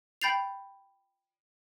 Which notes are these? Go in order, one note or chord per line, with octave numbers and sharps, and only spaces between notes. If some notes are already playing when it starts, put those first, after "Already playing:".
G5 B5 G6 A6 C7 F7